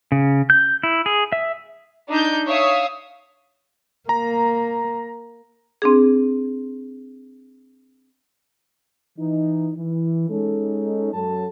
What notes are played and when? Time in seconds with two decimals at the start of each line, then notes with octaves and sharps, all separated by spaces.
0.12 C#3
0.50 G6
0.83 E4
1.06 G#4
1.32 E5
2.10 D4 D#4 G6
2.47 C#5 E5 F5 D#6
4.09 A#3 A#5
5.82 C4 D4 G#4
9.18 E3 D#4
9.77 E3
10.29 G#3 C#4 D#4 A4
11.13 F#2 F#3 A4 A5